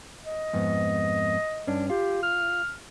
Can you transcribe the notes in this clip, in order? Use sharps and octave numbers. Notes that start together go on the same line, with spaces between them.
D#5
F2 G#2 B3
G2 C#4 D4
F4 G4
F6